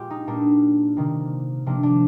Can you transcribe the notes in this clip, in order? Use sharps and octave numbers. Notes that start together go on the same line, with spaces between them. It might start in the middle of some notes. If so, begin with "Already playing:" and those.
Already playing: A#2 G#3 F4 G4
D#4
A#2 G3 A#3 D4
C3 D#3 A#3
C3 F3 A#3 D4
D4